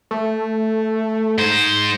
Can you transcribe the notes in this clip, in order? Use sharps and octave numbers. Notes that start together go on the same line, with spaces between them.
A3
G#2 C5